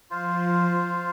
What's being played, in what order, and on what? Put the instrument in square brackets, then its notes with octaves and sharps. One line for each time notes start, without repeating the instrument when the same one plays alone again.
[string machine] F3 [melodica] F4 C5 F5